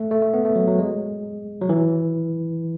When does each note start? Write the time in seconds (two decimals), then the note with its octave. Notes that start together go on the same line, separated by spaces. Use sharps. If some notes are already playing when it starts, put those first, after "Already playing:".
Already playing: A3
0.11 A3
0.22 A3
0.34 B3
0.45 A3
0.55 F#3
0.67 F#3
0.79 G#3
1.62 F#3
1.69 E3